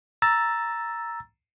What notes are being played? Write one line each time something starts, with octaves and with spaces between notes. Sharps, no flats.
A#5 E6 A6